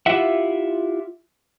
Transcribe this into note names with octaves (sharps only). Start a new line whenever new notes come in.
E4 F4 G4 E5 F#5